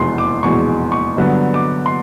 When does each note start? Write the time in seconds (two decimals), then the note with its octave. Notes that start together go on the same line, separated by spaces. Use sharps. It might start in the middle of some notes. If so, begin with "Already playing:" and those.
Already playing: F1 E2 B2 G#3 C6
0.18 D6
0.43 F1 E2 B2 G#3 C#6
0.92 C#6
1.17 G2 D3 F#3 B3
1.54 D6
1.86 C6